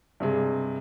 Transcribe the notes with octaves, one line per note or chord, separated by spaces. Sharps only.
G2 C3 G#3